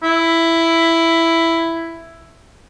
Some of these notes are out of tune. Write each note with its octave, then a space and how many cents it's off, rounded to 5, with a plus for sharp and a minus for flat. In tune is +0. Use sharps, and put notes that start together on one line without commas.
E4 +5